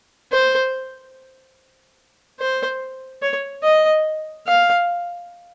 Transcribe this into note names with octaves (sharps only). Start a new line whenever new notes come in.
C5
C5
C#5
D#5
F5